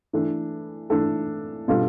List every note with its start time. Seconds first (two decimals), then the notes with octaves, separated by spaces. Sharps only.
0.13 E3 A3 D4 A4
0.90 E3 A3 D4 A4
1.68 B2 G3 D4 F4 A4